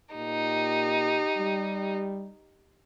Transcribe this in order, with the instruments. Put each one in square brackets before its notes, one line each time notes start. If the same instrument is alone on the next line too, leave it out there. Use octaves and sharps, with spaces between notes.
[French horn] A#2 [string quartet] D#4 [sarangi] G4
[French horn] G3